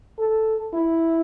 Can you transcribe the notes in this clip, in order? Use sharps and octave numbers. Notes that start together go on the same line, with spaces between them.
A4
E4